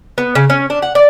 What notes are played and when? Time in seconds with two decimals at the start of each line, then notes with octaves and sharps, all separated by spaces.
0.18 B3
0.35 C#3
0.50 C#4
0.70 D4
0.82 F#5
0.95 D5